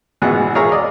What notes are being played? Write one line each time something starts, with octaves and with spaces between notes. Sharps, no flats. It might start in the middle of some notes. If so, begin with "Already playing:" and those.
G#1 B2 E3 G#4 F#5
G#4 A#4 C#5 E5 F5 A#5
D5 D#5